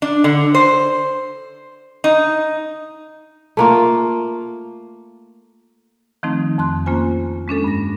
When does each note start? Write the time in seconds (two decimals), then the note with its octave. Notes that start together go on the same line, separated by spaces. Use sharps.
0.02 D4
0.24 D3
0.54 C5
2.04 D#4
3.57 A3 A#3 F4
6.23 D#3 F3 A3 C4 D#4
6.58 F2 C6 F#6
6.86 A#3 C#4 F4 C5 G#5
7.48 G#3 C#4 D4 A4
7.64 G2 A#6